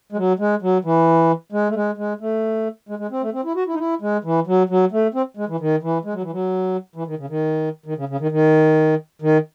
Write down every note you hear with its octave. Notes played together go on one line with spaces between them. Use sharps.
G#3
F#3
G#3
F#3
E3
G#3
A3
G#3
G#3
A3
G#3
G#3
C4
A3
C4
E4
F#4
E4
D#4
E4
G#3
E3
F#3
F#3
A3
C4
G#3
E3
D#3
E3
G#3
F#3
E3
F#3
E3
D#3
C#3
D#3
D#3
C#3
C#3
D#3
D#3
D#3